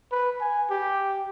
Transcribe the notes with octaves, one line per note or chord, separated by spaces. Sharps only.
B4
G#5
G4